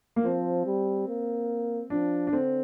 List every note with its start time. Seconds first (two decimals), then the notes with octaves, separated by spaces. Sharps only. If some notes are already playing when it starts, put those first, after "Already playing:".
0.16 A#3
0.24 F3 C4
0.66 G3
1.08 A#3
1.90 F3 D4
2.27 D4
2.32 D3 C4